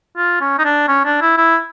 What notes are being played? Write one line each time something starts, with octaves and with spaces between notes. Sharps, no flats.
F4
C#4
D#4
D4
C#4
D4
E4
E4